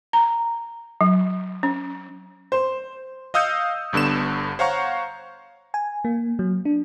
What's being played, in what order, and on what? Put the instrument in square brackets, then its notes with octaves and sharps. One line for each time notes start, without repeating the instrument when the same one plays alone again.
[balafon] A#5
F#3
C#4
[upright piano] C5
[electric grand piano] D#5 F5 D#6 E6 G6 C#7
G1 G2 D3 B3 E7
C5 C#5 F5 F#5 A#5 C#6
[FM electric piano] G#5
A#3
F#3
D4